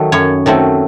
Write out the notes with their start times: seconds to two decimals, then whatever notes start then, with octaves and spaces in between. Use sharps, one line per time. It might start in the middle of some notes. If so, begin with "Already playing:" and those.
Already playing: D#3 F#3 A3
0.12 F#2 C#5
0.46 D#3 F#3 A3 C4